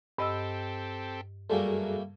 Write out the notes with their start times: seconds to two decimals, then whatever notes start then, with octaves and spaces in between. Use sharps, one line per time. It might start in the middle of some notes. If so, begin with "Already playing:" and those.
0.18 G2 C4 G4 A4 D#5 E6
1.50 F#2 G3 A3 A#3 F#4 G#4 A4